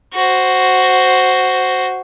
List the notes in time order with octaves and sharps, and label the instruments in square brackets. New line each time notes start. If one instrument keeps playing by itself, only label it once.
[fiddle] F#4 C5